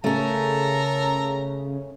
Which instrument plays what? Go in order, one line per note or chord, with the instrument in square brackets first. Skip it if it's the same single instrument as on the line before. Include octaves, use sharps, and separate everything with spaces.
[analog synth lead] C#3 [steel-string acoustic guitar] A3 C#4 [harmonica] A4 A#4 A#5